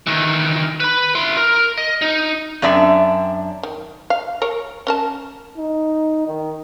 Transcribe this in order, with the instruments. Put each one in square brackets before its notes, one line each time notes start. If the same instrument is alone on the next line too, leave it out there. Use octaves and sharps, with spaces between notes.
[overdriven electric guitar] D#3 E3
B4 B5
E4 C6
A#4
D#5
D#4
[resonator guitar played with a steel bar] F#2 C4 D4 D5 E5
[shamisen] D#3
F5
A#4 C#5
C#4 A#4 A5
[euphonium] D#4
D#3